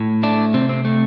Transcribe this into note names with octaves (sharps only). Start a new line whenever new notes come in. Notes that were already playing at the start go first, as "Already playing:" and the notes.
Already playing: A2
A3 D4
C3 C4
C4
A3